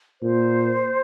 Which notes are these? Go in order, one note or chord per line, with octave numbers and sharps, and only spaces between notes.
A#2 C5